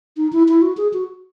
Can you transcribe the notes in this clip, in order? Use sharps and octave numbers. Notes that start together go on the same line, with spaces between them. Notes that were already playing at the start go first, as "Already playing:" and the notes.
D#4
E4
E4
F#4
G#4
F#4